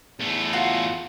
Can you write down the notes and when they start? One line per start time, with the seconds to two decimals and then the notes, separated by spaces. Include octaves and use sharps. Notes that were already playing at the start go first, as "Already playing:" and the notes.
0.19 E2 A3
0.53 F4 F#4